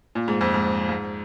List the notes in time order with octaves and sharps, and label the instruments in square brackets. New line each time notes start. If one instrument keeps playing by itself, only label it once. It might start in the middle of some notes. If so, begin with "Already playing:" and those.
[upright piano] A#2
G#2
F2
G#2
G#2